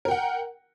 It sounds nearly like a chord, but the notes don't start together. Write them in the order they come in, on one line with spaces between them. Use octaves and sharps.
A#4 G5 F#5